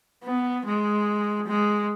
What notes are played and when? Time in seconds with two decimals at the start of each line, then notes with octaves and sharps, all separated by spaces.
0.23 B3
0.65 G#3
1.47 G#3